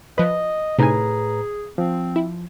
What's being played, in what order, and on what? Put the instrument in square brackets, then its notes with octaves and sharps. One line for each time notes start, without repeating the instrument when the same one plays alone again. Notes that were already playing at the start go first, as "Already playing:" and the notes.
[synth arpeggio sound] F3 B4 [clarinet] D#5
[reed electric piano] A2 B4 A#5 [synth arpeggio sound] C3 D#4 G#5 [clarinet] G#4
[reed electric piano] F3 [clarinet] C4
[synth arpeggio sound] E4